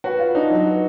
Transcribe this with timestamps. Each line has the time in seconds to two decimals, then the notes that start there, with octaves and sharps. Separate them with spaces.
0.04 F#4 B4
0.19 F4
0.35 D4 D#4
0.50 F#3
0.66 B4